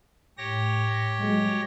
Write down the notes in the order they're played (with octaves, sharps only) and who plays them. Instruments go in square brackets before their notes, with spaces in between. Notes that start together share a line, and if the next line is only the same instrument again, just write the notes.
[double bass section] A2 [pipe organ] G4 C#5 A#6
[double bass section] F#3 G#3